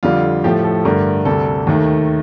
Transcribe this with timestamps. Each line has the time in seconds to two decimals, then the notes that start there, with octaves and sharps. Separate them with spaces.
0.03 F2 D3 G3 F4
0.44 A2 F3 A3 G4
0.64 A4
0.85 G2 D3 A3 A#4
1.25 D2 C3 G3 A4
1.67 D#2 D#3 A3